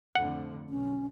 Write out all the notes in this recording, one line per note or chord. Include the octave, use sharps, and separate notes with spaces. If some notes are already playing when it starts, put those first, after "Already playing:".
F2 A2 D3 F#5
B1 C#4